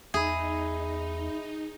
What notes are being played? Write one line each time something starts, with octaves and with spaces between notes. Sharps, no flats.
E2 D#4 G#4 E5 B5